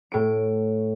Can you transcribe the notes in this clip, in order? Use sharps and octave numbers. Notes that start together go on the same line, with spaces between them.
A2 D7